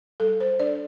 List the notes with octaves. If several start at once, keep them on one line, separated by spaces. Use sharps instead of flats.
G3 A4
C5
D4 D5